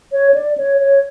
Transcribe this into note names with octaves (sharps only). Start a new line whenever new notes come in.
C#5
D5
C#5
C#5